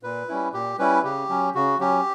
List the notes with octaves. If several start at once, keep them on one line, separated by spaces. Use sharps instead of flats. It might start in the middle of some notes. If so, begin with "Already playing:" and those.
A#2 B4
G3 C#4 E4
A#2 G4
G3 C#4 E4 B4
C#3 G4
F#3 C#4
C#3 F#4
F#3 C#4 G4